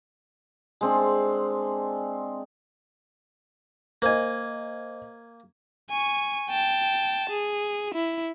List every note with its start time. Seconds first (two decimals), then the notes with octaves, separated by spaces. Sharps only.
0.81 G#3 C4 D4
4.02 A#3 C5 D#5 G#5
5.90 G#5 C#6
6.50 G5 A5
7.30 G#4
7.94 E4